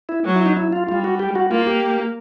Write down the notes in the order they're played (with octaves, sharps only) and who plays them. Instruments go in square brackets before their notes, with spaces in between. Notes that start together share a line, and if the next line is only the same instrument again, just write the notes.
[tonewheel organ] E4
[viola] F#3
[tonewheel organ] E4
D#4
E4
F4
[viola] G3 [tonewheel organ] F4
[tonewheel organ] F#4
G4
F#4
[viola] A#3 [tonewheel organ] F4
[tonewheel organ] G4